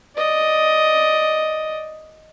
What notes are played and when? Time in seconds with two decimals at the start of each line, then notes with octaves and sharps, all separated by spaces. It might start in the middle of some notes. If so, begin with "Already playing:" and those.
0.16 D5 D#5